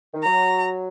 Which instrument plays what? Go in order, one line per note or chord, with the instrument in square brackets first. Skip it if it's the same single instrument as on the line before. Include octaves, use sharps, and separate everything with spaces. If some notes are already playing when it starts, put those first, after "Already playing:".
[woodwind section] D#3
[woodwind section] F#3 [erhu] A#5